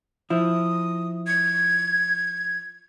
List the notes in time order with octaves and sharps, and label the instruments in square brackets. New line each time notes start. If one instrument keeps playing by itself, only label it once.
[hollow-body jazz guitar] F3 E4 [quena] D#6
[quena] G#6